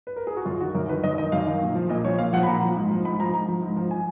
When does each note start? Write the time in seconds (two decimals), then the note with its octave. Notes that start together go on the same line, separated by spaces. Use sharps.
0.07 B4
0.16 A#4
0.27 G#4
0.37 F#4
0.46 F#2 F4
0.60 D#3 F#4
0.75 F#2 A#4
0.89 D#3 B4
1.04 F#2 D#5
1.18 D#3 D#5
1.32 F#2 F5
1.47 D#3
1.62 A#2
1.75 F3
1.89 A#2 D#5
2.04 F3 C#5
2.18 A#2 F5
2.33 F3 F#5
2.43 B5
2.47 A#2 A#5
2.62 F3
2.76 G#2
2.91 F3
3.05 G#2 B5
3.19 F3 A#5
3.34 G#2 A#5
3.48 F3
3.62 G#2
3.76 F3
3.91 G#5